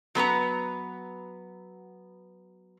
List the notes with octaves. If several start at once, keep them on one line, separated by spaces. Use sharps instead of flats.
F#3 B3 B4 A#5